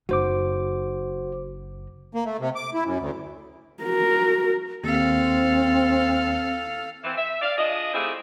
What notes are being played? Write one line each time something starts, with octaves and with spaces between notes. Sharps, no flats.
F#1 D#4 F#4 C5 D6
A#3
A3
C3
D6
E4
F#2
D2
F#4 A#4
D#2 C4 A4 F5
E3 C4
E5
D5 F5
D4 F4 G#4 D#5
A3 C4 E4 F4 G4 G#4